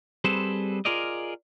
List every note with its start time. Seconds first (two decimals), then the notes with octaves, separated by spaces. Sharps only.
0.24 G3 C4 G#4 A4 B4 C5
0.85 F4 G#4 A#4 D5 D#5